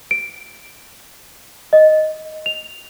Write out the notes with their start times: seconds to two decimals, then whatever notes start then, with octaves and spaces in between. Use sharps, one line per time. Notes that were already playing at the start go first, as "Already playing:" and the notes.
0.11 D7
1.73 D#5
2.46 F7